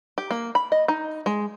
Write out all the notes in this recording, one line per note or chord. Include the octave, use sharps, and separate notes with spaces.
G4
A#3
B5
D#5
D#4
G#3